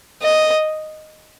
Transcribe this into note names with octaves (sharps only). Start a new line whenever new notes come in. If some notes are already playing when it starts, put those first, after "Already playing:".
D#5